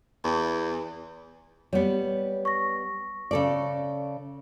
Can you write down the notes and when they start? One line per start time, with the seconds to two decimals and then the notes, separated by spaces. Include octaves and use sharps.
0.24 E2
1.73 G3 B3 C#5
2.45 C#6 A#6
3.31 C#3 A4 D5